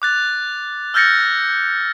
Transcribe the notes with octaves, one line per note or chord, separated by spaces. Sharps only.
D6 F#6 A6
E6 F6 G6 A6 A#6 C#7